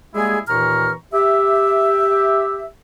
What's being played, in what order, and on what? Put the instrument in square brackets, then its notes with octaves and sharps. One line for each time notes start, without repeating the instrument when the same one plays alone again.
[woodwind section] G3 G#3 A#3 E4 G#4
D#2 A#2 E3 A#5 C#6 F6
G4 E5